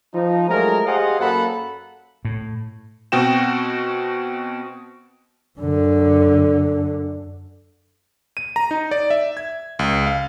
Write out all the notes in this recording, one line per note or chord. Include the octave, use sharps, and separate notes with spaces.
F3 D#4
F#3 G#3 A3 A#4
G4 G#4 C5 D#5 F5 F#5
F#2 F#3 A#3 A4 F#5 B5
A2
B2 C4 F#4 G5 E7
F#2 D3
D#7
A#5
D#4
D5
E5
G#6
C#2
F5